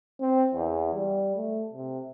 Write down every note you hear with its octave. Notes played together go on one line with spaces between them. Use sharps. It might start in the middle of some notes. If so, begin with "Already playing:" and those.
C4
E2
G3
A3
C3